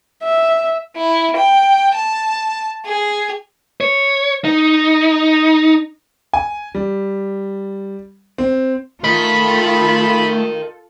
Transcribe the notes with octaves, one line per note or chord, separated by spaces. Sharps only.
E5
E4
G5
A5
G#4
C#5
D#4
G#5
G3
C4
A3 F4 A4 A#4 D#5 B5